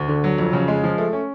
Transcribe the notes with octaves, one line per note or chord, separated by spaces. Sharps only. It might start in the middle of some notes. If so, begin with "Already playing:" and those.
Already playing: D2
D3
F#3
F2
C#3
G#3
F3
A3
C#4